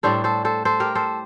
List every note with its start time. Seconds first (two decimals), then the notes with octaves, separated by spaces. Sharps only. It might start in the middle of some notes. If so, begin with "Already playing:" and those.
0.03 A2 G3 D4 A4 C5
0.24 A4 C5
0.45 A4 C5
0.65 A4 C5
0.80 G4 A#4
0.95 A4 C5